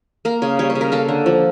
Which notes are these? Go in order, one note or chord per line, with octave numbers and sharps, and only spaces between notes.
A#3 A#4
C#3 C#5
G3 C#5
C#5
C#3
A#4
A#3 A4
D3
F3